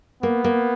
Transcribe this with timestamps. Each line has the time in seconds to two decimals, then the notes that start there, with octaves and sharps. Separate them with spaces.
0.22 A#3 B3
0.44 A#3